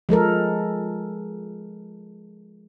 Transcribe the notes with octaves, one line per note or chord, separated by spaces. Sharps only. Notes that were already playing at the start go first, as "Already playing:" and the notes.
F3 G#3 A4 A#4